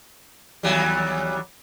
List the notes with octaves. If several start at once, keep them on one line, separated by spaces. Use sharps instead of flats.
D#2 F#3 G3